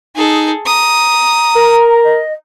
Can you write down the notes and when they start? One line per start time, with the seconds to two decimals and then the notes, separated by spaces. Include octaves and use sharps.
0.16 D#4 G#4 A4
0.66 A#5 D#6
1.56 A#4
2.04 D#5